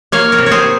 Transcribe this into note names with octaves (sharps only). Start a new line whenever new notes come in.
A#3 C#5 F5
A#4 C#5
C3
C#5
G#4 C5